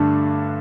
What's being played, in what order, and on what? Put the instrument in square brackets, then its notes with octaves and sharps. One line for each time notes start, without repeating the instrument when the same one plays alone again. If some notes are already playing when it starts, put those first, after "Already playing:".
Already playing: [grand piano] G2 D3 A3 D4 A5